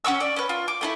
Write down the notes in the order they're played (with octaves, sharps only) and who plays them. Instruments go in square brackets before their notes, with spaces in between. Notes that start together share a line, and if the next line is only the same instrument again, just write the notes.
[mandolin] C#4 F#5 C#6 E6
D5
C#4 B4
F4
D6
A3 D4 E4